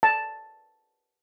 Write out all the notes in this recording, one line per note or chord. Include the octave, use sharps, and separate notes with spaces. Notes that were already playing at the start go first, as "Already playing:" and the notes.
A5